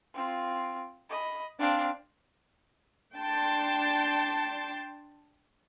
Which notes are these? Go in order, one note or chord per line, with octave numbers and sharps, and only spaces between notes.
C4 F4
D#5 B5
C4 D4 F5
D4 G5 A5 C6